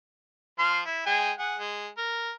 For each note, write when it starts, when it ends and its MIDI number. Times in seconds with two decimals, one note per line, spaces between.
0.59 0.81 53
0.59 0.81 84
0.59 0.81 89
0.85 1.05 64
1.06 1.32 56
1.06 1.32 79
1.06 1.32 80
1.39 1.57 68
1.39 1.57 78
1.58 1.88 56
1.98 2.30 70